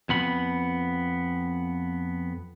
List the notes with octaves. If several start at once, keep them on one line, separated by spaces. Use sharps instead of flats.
F2 B3 B5